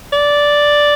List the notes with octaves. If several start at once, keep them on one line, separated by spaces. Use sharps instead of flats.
D5